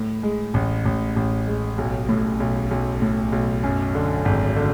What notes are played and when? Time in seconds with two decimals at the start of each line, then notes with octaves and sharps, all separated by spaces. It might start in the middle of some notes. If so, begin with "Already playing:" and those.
Already playing: A2
0.23 G#3
0.54 A1
0.85 A1
1.16 A1
1.47 G#3
1.78 B1
2.09 A2
2.40 B1
2.71 B1
3.02 A2
3.32 B1
3.64 F#2
3.95 D3
4.25 G#1
4.56 D3